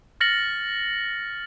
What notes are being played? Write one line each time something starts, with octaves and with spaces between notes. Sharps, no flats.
F6 A6 A#6 C#7 F#7